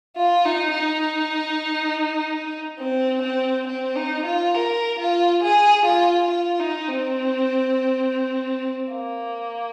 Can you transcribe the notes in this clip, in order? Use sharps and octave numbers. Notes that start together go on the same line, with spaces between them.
F4
D#4
D#4
C4
C4
C4
D#4
F4
A#4
F4
G#4
F4
F4
D#4
C4
A#3